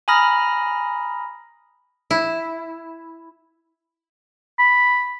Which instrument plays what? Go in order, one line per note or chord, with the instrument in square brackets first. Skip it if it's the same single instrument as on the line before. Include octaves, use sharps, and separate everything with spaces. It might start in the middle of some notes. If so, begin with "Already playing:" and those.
[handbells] G#5 A#5 B5 D#6 F6 A#6
[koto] E4
[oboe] B5